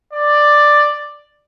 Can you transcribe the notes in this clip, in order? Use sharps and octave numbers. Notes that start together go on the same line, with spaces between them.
D5